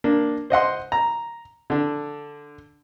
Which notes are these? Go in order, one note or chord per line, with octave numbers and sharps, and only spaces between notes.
A#3 D4
C5 D#5 F#5 C6
A#5
D3 D4